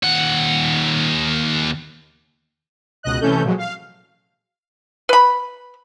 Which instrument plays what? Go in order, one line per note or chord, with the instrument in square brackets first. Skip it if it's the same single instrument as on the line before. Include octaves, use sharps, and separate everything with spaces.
[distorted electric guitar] D#2 F#5
[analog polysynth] C#2 B2 D#5 F#6
C3 E3 A3 C#4 A4 G6
A#2 F3 F#3 G#3
F5
[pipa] B4 B5